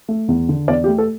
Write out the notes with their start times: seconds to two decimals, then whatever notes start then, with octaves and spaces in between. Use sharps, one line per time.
0.09 A3
0.29 E2
0.49 D3
0.68 E2 D5
0.84 G4
0.88 A3
0.98 A4